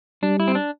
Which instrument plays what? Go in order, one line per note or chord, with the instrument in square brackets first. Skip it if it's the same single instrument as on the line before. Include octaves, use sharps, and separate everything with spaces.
[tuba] G3 [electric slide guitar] D4
[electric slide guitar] E4
C4
D4